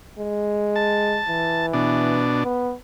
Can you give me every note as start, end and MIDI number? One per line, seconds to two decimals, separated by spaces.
0.19 1.20 56
0.76 1.66 81
1.28 2.24 52
1.74 2.44 47
1.74 2.44 62
2.44 2.74 59